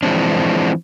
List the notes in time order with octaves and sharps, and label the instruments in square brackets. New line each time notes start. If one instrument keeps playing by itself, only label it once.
[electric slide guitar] E3 F3 G#3 C4 D4